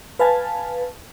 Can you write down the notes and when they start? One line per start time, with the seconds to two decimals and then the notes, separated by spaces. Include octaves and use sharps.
0.19 B4 F5 G#5 A5